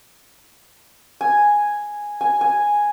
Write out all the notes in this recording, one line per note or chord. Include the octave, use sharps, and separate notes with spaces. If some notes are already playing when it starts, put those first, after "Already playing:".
G#5
G#5
G#5